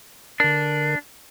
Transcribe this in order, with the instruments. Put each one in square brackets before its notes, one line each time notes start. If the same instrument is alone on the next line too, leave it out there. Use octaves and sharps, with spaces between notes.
[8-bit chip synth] D3 A#4 [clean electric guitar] D4